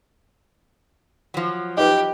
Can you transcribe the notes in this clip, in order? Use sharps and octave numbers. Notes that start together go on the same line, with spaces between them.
F3 F#3
D#4 G4 B4